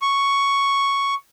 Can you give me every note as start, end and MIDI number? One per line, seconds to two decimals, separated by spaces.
0.02 1.14 85